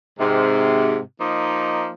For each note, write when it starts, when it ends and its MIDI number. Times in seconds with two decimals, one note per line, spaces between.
0.19 0.98 44
0.19 0.98 48
1.20 1.91 53
1.20 1.91 58
1.20 1.91 63